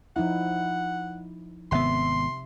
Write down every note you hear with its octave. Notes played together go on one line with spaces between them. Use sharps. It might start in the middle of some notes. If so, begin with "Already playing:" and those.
F3 D#4 E4 F#5
G#1 C3 B3 E5 C6